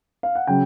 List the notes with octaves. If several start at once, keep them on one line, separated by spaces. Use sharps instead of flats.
F5
F#5
C#3 F#3 G5